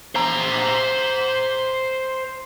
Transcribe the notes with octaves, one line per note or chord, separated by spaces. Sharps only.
C5 A#5